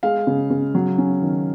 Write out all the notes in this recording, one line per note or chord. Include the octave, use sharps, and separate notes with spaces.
G#3 F5
C#3
C#3
F#3
C#4
D#3